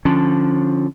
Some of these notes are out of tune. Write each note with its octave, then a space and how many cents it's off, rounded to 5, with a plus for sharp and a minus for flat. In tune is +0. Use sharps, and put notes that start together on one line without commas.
D3 +0 F3 +0 C#4 -20